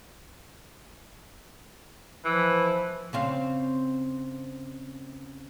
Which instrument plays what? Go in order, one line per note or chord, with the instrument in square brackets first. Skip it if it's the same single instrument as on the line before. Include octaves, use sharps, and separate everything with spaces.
[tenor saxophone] E3 [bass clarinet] F3
[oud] C#3 C4 F5